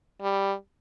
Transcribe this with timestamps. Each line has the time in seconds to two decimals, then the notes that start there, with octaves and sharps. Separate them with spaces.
0.22 G3